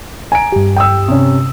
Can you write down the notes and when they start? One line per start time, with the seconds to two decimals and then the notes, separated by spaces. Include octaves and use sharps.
0.32 G#5 A#5 D7
0.52 G2 G4
0.76 G5 D#6 E6
1.08 C3 C#4